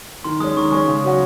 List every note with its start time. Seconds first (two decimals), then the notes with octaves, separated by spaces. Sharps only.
0.24 D#3 C6
0.40 G#3 C#4 D#6
0.52 C6
0.57 D#3 C#6
0.72 G#3 C#4 C#6
0.88 C#3
1.04 F#3 C#4 F#4